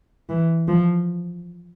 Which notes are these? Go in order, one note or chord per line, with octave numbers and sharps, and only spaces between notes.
E3
F3